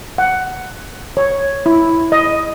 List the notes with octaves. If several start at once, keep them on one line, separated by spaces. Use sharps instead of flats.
F#5
C#5
E4
D#5